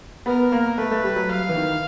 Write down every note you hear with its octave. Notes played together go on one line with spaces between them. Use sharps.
B3 A#4
A#3
A3 B4
A3
G3
F#3
F5
E3
D#3